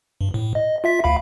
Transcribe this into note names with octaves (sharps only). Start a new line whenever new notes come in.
G2
A2
D#5
F4 E5 B6
D2 F5 B5